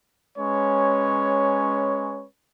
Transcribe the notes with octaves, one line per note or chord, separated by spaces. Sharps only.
G#3 C#4 B4 C#5